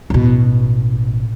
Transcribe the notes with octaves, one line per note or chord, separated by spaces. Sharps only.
A1 B2